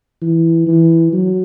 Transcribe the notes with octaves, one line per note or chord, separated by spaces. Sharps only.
E3
E3
F#3